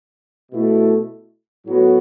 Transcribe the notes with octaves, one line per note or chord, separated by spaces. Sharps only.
B2 A3 E4
A2 F#3 B3 F#4